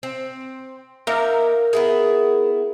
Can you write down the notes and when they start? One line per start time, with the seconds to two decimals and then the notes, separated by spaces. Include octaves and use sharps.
0.03 C4
1.07 A#3 D#4 A#4 E5
1.73 B3 E4 G#4